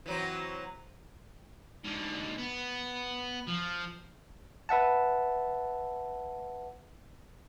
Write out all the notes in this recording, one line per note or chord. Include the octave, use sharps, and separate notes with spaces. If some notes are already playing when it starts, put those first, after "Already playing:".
E3 F#3 C4
G#2 D3
B3
F3
B4 E5 F#5 A5